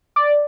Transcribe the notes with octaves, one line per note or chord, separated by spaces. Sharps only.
D5